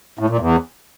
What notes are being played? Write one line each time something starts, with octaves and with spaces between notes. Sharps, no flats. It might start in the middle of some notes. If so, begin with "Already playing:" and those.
A2
A#2
E2